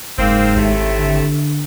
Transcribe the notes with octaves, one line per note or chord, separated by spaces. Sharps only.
F#1 G#2 A#3 C4
G#1 A2 C3 A3
D3